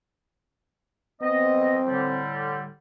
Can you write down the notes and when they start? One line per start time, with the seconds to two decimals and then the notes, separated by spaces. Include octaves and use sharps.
1.22 B3 C4 D#5
1.87 A2 D3 G3